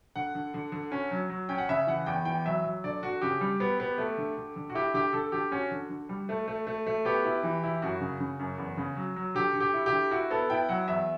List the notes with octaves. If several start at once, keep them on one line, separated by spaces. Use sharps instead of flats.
D3 F#5
D3
D3
D3
C#4
F#3
F#3
C#4 G5
F#5
C#3 E5
E3 F#5
E2 G5
E3 G5
F#3 E5
F#3
D3 D5
D3 F#4
C#3 G4
G3
B3
B3
A3
D3
D3
D3
F#4
E4 G4
D3 G4
D3 A4
D3 G4
C#4 F#4
D3
D3
G3
A3
A3
A3
A3
B3 G4
E4
E3
E4
F#2 F#4
C#3
C#3
F#2
E2
C#3
F#3
F#3
D3 G4
D3
G4
E4
G4
D3
E4 F#4
B3 A4
E4 G5
F#3 F#5
E2 E5